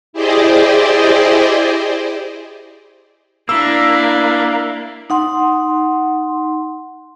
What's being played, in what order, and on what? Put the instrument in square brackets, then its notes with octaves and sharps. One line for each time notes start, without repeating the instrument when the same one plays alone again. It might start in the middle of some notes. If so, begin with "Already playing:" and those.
[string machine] E4 G4 G#4 C5 D5 D#5
[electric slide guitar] A#3 [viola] D4 E4 [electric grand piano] E6
[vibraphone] D#4 F#5 C6